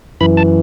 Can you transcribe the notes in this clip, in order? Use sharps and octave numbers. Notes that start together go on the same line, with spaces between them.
F#2 E3 B5
A5